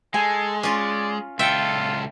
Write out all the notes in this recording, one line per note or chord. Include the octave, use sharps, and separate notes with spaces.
G#3 A4 G#5
C#4 F4 D5
C#2 F4 A4 E5 G5